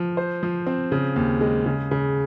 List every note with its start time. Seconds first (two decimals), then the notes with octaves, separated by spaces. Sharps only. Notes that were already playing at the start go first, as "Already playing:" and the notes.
Already playing: F3
0.17 C5
0.43 F3
0.67 C4
0.92 C#3
1.16 D#2
1.41 G#3
1.66 C#3
1.91 C#3